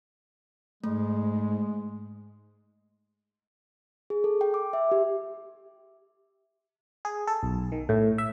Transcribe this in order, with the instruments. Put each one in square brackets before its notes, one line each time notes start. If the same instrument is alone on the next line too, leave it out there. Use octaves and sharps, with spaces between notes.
[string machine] G#2 [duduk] G#3 [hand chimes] A3
[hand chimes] G#4
A4
G5
D6
E5
G4
[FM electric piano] G#4
A4
B1
D#3
A2
E5